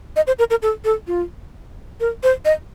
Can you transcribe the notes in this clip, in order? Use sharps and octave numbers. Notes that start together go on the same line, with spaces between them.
D#5
C5
A#4
A#4
A4
A4
F4
A#4
C5
D#5